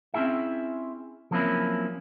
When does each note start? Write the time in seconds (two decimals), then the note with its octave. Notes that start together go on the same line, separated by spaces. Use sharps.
0.14 C4 C#4 E4 G#4 E5
1.31 F3 F#3 A#3 C4 C#4 E4